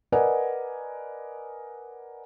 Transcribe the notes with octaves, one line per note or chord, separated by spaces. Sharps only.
A#4 B4 D5 D#5 F#5 G#5